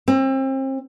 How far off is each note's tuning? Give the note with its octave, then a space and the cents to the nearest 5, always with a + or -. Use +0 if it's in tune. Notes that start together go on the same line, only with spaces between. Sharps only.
C4 +35